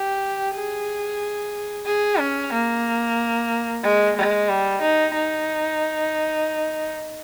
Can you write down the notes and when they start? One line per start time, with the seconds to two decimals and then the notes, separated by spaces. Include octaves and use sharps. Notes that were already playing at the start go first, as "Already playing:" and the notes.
Already playing: G4
0.55 G#4
1.86 G#4
2.19 C#4
2.52 A#3
3.83 G#3
4.16 G#3
4.48 G3
4.82 D#4
5.14 D#4